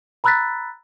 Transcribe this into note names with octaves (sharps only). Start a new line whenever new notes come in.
A#5 B5 E6 F#6 A6 B6